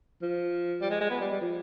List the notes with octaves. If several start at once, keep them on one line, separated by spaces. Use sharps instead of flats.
F3
G3
G#3
G#3
B3
G3
G3
F3